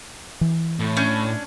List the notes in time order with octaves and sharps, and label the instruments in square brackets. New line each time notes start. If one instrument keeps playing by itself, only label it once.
[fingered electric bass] E3
[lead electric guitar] A2
[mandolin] C#4 D4 G6